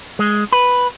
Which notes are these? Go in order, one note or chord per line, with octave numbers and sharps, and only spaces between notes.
G#3
B4